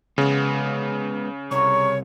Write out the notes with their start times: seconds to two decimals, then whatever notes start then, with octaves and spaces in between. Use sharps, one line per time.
0.18 C#3 G#3 B3
1.51 C2 C#5 A#5 C#6